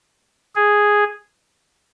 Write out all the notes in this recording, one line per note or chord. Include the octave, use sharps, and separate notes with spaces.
G#4